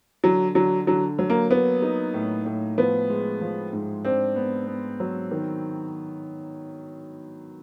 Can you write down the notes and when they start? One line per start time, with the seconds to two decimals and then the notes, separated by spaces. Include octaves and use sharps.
0.24 D3 F#3
0.55 D3 F#3
0.87 D3 F#3
1.19 F#3
1.30 A#3
1.51 A#3 B3
1.82 D#4
2.14 A2
2.46 A2
2.78 F3 B3
3.10 G#3
3.41 F3
3.73 G#2
4.04 C4 D4
4.36 B3
4.67 B3
5.00 F#3
5.31 D#3